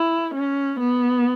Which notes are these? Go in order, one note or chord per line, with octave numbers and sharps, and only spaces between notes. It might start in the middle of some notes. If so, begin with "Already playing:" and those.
Already playing: E4
C#4
B3